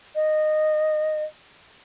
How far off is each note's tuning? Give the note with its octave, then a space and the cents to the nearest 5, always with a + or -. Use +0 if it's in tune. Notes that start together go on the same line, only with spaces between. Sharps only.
D#5 -15